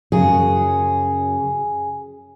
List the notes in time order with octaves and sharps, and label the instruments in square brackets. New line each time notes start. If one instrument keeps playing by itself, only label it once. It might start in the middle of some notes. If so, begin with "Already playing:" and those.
[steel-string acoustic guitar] F#2 C#3 F#3 G#4